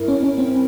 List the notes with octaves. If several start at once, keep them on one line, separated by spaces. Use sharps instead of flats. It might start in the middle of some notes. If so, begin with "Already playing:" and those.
Already playing: G2 G3 E4 A#4
C#4
C#4
C4